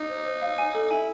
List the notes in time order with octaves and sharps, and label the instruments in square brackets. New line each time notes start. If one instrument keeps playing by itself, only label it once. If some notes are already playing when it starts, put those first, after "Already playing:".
Already playing: [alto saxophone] D#4
[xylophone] C5
C5
F5
G#5
A4
[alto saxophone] E4 [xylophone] G#5